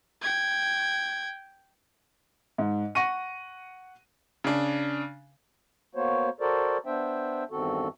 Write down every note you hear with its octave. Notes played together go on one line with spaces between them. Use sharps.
G5 G#6
G#2
F#5 C#6 A#6 D#7
C#3 D4
A#3 B3 F#4 C5 C#5
F#4 A4 A#4 C5 D5
B3 D4 C5 E5 G5
E2 G2 D#3 C4 F#4 A4